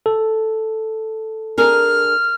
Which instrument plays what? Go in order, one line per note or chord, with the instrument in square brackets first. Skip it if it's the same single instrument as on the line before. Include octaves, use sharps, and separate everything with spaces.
[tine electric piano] A4
[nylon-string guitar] D4 G#4 A#4 [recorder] F6